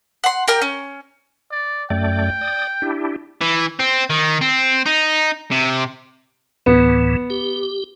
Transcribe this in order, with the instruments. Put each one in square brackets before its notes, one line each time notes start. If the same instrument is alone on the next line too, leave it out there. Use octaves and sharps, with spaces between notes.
[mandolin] F#5 C6
G4 A#4 G5 F6
C#4
[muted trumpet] D5
[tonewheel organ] F#2 A3 D5 [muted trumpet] G5
[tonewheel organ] D5 D#6
D4 E4 G4
[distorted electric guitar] E3
C4
D#3
C4
D#4
C3
[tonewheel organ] D2 A2 E3 [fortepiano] B3
[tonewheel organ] G4